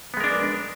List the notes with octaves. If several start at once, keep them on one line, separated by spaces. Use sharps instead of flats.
G#3 B3 D4 A#4